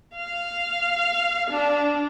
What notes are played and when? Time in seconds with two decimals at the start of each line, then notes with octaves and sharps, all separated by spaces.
0.16 F5
1.51 D4